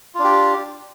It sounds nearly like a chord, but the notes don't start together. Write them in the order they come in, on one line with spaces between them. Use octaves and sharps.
F4 D4 G4